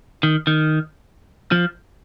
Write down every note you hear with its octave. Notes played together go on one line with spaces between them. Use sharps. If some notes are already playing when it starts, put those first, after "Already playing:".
D#3
D#3
F3